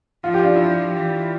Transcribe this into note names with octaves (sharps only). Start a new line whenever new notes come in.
F3 F4
G4
D4 F4
E4
D4
E3